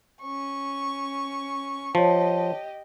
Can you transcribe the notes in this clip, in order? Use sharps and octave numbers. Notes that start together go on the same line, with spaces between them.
C#4 C#6
F3 G4 C#5 D#5 A5